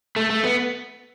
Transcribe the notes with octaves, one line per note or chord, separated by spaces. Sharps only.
A3
A3
B3